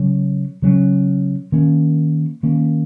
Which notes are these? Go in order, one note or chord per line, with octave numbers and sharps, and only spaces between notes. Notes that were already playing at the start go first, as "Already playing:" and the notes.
Already playing: C#3 F#3 C#4
C#3 F#3 C#4
D#3 A#3 C#4
D#3 A#3 C#4